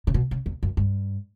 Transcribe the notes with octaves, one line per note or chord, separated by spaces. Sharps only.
C#3
B2
C#3
E2
F#2
G2